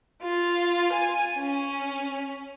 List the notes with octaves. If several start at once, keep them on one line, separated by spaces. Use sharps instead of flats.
F4
G#5
C#4